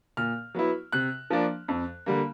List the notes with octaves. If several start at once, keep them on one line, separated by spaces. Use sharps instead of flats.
A#2 F6
F#3 B3 E4
C3 F#6
F3 A#3 D4
F2
D3 G3 A#3